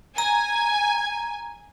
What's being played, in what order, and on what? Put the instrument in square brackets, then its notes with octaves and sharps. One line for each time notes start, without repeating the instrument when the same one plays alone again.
[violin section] G#5 [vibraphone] A#5